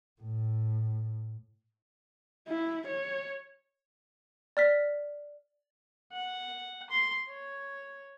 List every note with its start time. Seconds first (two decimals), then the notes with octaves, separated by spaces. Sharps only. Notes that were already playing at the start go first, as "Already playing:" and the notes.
0.21 A2
2.48 E4
2.88 C#5
4.57 D5 F6 B6
6.12 F#5
6.90 C6
7.29 C#5